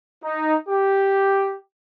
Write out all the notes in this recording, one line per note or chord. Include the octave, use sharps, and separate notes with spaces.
D#4
G4